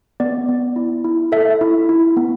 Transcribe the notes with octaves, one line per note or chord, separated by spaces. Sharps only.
B3 D5
B3
E4
E4
A4 E5
E4
E4
B3